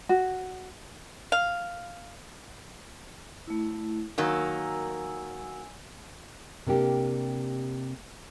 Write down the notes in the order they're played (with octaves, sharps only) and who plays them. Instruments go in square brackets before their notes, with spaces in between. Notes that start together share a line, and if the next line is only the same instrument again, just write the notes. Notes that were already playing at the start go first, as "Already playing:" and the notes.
[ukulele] F#4
[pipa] F5
[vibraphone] A3 E4
[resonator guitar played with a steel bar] D#3 F#3 A#3 [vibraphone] G#5 E6
[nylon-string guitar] C3 A#3 D4 G4